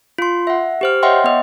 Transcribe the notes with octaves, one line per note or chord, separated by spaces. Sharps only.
F4 C6
E5 F#5
G4 C5 F6
C#5 D#5 E5 F#5 G5 C6
B3 D#5